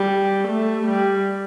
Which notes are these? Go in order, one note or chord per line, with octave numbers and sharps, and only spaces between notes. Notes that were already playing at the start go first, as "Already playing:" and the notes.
Already playing: G3
A3
G3